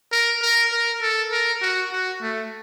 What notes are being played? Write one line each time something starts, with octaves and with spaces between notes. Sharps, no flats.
A#4
A#4
A#4
A4
A#4
F#4
F#4
A3